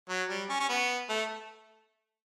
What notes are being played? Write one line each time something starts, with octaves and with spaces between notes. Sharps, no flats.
F#3
G3
C#4
C#4
B3
A3